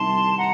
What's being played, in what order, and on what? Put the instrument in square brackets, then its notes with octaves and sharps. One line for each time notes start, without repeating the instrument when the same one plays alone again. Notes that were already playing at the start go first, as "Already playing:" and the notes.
Already playing: [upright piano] C2 C3 D#3 [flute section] A5 C6
[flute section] F#5 A#5